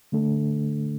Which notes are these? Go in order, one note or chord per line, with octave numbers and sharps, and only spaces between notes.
D3 A3 D4 A4